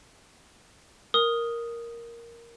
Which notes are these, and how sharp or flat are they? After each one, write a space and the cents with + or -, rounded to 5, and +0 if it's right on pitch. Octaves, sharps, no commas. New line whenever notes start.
A#4 +0 D#6 +0